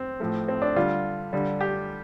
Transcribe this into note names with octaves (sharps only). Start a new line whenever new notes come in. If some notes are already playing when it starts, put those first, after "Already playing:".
Already playing: C4
A2 F3 A3
C4
D4
D3 G3 F4
D3 G3
G4